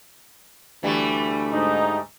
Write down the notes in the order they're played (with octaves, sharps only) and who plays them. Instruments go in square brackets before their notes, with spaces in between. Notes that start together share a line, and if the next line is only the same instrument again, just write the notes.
[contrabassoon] D2 [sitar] E3 G3 A3
[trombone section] G#2 D#4